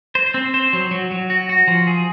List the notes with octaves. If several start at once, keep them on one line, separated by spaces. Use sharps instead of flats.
C5
C4
C5
F#3
F#3
F#3
F#4
F#4
F3
G#4